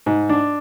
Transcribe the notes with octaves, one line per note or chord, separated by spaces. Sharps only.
G#2
D4